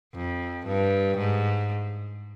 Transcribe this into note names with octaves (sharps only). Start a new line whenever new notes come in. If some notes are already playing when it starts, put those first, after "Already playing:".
F2
G2
G#2